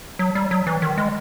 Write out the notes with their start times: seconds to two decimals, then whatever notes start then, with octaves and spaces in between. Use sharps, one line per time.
0.19 F#3
0.35 G3
0.51 F#3
0.67 E3
0.82 D#3
0.98 G#3